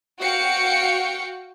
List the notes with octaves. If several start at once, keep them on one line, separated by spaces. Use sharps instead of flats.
F#4 F5 G5 C#7